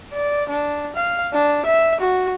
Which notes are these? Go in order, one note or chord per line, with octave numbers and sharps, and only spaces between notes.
D5
D4
F5
D4
E5
F#4